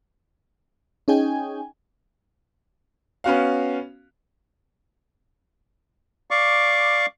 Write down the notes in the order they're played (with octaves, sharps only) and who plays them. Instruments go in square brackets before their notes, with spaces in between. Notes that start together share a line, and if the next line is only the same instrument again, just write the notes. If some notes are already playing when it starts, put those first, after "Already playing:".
[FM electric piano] C#4 D#4 G#4 D#5 G5 G#5
[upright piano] B3 C#4 F#4 F5
[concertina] D5 F5 C#6 D6